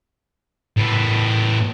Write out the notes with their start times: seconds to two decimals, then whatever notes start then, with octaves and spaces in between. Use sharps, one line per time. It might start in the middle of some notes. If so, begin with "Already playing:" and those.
0.77 A2 B3